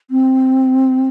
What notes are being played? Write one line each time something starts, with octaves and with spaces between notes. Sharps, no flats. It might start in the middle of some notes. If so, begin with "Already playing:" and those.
C4